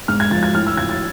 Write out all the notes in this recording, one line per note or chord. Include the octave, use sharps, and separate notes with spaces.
G#2 F6
G#6
F3 A6
G#6
A2 F6
E6
F3 G#6
A6